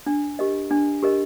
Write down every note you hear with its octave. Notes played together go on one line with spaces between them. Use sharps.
D4
G4 A#4 D#5
D4
G4 A#4 D#5